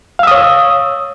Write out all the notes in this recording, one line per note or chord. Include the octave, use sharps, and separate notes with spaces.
C#5 F5 D#6 E6